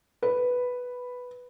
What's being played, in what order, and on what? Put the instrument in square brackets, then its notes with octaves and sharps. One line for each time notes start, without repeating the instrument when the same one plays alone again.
[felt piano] B4